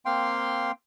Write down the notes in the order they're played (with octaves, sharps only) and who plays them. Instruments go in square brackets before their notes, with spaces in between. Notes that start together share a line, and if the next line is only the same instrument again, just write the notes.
[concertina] A#3 C4 F5 G5 C6